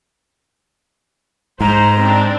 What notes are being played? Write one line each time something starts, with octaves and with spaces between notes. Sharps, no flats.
G#2 C5 A#5
C4 D4